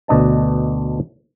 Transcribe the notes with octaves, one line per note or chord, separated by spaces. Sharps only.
D2 B2 D4 D#5 A5